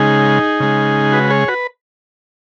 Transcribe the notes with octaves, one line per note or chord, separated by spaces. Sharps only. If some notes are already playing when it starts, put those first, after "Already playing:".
Already playing: C#3 G#3 D#4 G#4
C#3 G#3
F#4 B4
G#4 C#5
F#4 B4